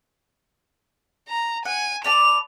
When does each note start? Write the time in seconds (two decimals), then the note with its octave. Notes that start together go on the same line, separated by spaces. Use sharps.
1.29 A#5
1.65 F#5 G#5
2.04 B4 D5 A5 F7